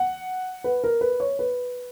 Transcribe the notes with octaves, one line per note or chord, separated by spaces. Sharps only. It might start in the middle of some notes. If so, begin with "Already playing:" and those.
Already playing: F#5
B4
A#4
B4
C#5
B4